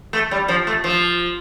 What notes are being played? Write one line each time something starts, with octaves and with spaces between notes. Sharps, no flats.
A3
G3
F3
A3
F3